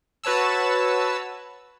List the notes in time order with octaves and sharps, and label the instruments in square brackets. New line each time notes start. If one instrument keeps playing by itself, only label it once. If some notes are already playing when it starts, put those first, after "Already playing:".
[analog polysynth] F#4 B4 C#5 A5 E6